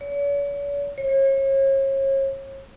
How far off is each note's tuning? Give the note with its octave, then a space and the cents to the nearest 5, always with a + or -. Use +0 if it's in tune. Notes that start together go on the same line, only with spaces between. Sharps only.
C#5 +45
C#5 -35